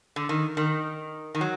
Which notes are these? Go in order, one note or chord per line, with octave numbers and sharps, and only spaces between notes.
D3
D#3
D#3
D#3
F#3